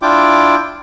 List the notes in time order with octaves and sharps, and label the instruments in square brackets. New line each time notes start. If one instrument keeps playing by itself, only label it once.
[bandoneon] D4 E4 F4 G5 D6